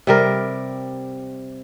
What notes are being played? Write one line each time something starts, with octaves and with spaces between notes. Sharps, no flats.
C3 G3 A#4